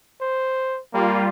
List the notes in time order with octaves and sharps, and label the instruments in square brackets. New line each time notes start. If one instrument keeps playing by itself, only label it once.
[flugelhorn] C5
[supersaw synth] G3 F4 [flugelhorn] A#3